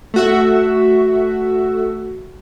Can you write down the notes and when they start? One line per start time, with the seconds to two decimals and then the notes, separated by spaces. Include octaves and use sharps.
0.14 A3 F#4 E5